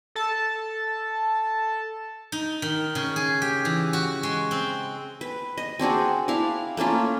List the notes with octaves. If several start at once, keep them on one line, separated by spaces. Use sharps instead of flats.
A4 A5
D#4
D#3
C#3
G#4
G4
E3
F#4
G#3
C4
B4
D#5
C4 D4 F#4 G#4
D4 E4 F5
A3 A#3 C#4 F4